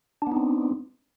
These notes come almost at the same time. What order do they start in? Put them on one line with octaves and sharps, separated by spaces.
D4 B3 D#4 C4